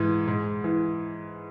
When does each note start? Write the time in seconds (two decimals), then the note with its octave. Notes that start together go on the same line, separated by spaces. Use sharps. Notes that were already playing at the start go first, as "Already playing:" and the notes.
Already playing: G#2 E3
0.27 G#2
0.64 E3